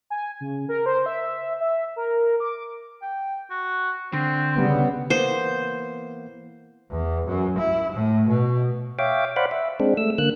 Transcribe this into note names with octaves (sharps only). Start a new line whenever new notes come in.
G#5
C#3
A#4
C5
E5
E5
A#4
D6
G5
F#4
D3 C4
C#3 G3 B3
E3 A#3 B3 C5
E2
F#2
E4
A2
B2
C#5 E5 F5 G5 D6
C5 D5 F5 F#5 B5
E5
G#3 C4 D4
A3 E6
D3 A#3 F#6